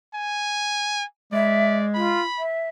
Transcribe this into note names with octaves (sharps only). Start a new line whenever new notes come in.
G#5
G#3 D5 E5
F4 B5
E5